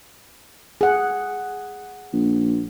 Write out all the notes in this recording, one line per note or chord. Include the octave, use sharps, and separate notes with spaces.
G#4 F#5
A#1